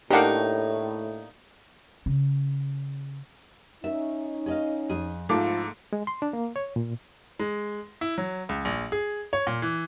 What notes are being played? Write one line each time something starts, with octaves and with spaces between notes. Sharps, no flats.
A2 A#3 D4 D#4 G4 F#5
C#3
C#4 D#4 E5
G#4 D#5 F5
F2 G#4
G#2 F3 A3 E4 F4 A4 F5 D6
G#3
C6
D4
A#3
C#5
A#2
G#3
E4
F#3
C#2
A#1
G#4
C#5
A#2
E3